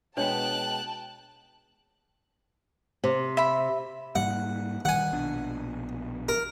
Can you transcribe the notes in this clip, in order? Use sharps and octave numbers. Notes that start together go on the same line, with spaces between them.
B2 G#3 B3 D4 C#5 G5 A5 F#6
C3
E5 B5
G#2 G3 A#3 F#5
D#3 G3 F#5 G#5
A#1 B2 D4
A#4